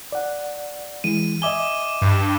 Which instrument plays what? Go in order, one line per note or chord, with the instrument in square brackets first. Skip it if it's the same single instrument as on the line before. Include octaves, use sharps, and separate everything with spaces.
[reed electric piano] D5 F#5
[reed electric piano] E3 G#3 [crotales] D#7
[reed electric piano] D#5 E5 G#5 [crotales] D6 G7
[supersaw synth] G2